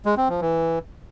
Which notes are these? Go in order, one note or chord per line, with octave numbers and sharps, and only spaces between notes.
G#3
C4
F3
E3